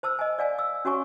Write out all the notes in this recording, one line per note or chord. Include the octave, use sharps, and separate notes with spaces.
C5 A5 E6
D#5 G#5
D5 F5 G#5
E6
C#4 F#4 C#5 G#5 C#6